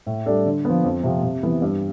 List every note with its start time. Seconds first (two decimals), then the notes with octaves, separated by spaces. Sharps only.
0.06 A2
0.26 G3 D4 A4
0.46 D3
0.65 F3 B3
0.84 F2
1.03 C3 F3 C4
1.23 C3
1.43 E3 B3 E4
1.62 G2